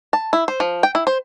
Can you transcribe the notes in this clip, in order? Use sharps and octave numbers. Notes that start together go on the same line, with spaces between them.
A5
E4
C5
F3
G5
E4
C5